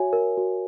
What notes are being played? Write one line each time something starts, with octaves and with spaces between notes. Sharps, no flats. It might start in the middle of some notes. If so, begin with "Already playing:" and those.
Already playing: F#4 C#5 E5 G#5
A#4
F#4